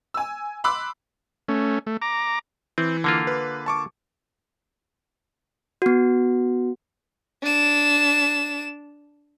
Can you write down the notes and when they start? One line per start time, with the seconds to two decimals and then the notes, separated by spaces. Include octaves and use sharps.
0.14 G#5 E6
0.64 B5 C6 D6 E6 F#6
1.48 A3 C#4
1.87 A3
2.02 A#5 D6
2.78 E3 C4
3.04 D3 A#3 F4
3.27 B4
3.66 A5 C#6 D6
5.82 B3 F#4
7.43 D4 E7